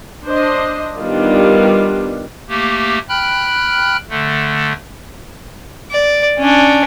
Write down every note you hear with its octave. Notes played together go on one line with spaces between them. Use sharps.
D4 C5 D#5
D#3 G3 B3 D4 F4
A3 A#3 G4
G5 B5 F6 F#6
D3 A3
D5
C#4 D4